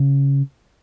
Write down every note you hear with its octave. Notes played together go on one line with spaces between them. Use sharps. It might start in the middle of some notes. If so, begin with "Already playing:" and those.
Already playing: C#3